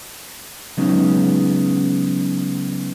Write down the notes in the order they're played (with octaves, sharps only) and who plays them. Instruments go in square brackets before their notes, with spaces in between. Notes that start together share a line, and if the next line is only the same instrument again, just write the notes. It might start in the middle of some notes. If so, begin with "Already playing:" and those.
[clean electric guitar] C#3 F#3 G#3 B3 C#4 D#4